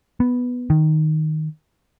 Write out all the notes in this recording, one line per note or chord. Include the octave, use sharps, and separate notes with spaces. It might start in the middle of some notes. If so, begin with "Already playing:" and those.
B3
D#3